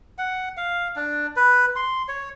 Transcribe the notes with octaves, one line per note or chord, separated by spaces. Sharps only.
F#5
F5
D4
B4
C6
C#5